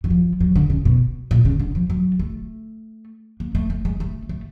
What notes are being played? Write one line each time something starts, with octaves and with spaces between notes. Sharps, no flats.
E3
F3
F#3
D3
C#3
B2
A#2
C#3
D3
F3
F#3
A3
A#3
A3
A3
G#3
A3
A3